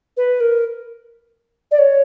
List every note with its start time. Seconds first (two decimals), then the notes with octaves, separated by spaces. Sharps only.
0.17 B4
0.40 A#4
1.71 D5
1.78 C#5